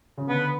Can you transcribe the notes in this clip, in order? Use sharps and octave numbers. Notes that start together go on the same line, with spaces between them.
C#3
D3 B3